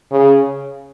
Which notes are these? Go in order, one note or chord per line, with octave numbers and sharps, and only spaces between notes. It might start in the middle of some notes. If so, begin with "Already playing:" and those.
C#3